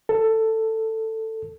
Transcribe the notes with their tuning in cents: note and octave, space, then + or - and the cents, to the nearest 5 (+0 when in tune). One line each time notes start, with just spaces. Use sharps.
A4 +15